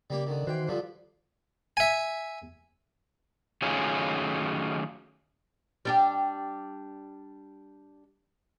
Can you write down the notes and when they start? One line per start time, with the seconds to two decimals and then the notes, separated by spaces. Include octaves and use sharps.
0.10 C#3 G3 A#3 G4
0.27 D3 D#3
0.47 D#3 E3 F#4 C5 G5
0.68 G2 D3 F3
1.77 E5 G#5
3.62 D#3 F#3 A3 C#4 F4 G#4
5.85 G3 D4 G4